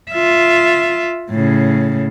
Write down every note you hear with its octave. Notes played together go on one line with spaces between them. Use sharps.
F4 E5
A2 C#3